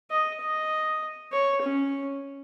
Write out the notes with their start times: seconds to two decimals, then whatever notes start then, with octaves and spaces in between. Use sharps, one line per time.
0.11 D#5
0.41 D#5
1.32 C#5
1.62 C#4